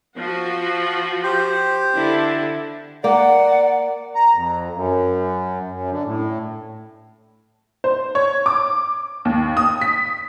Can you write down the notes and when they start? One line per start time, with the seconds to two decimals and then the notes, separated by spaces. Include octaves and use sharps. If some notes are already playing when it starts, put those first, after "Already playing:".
0.18 F3 F#4
1.23 G4 C5
1.96 D3 E4
3.04 A#3 D5 F#5
4.15 A#5
4.35 F2
4.75 F#2
5.71 F#2
5.90 D3
6.05 A2
7.84 C5
8.15 C#5
8.46 D6
9.25 D#2
9.57 D#6
9.81 B6